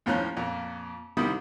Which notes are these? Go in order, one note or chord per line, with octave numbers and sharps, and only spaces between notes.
D#2 A2 F3 C#4 A#5 F#6
F2 A#2 A#5
C2 C3 D#3 G3 E4 D#6